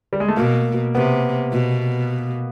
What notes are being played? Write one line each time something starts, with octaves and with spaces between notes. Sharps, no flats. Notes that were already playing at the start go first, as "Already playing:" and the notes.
G3
G#3
A3
B2 A#3
C3 B3
B2